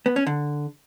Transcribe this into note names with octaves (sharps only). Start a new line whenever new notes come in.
B3
C#4
D3